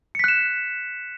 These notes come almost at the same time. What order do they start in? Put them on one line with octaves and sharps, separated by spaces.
C#7 B6 F#6 E7